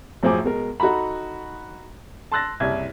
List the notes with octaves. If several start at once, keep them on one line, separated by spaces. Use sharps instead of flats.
F#2 A2 F3 F#3 G#4 D6
B2 G#3 A#4
D#4 F#4 A4 A#5 B5
A5 C6 E6 F#6 A6 A#6
F#1 C2 E4 G#6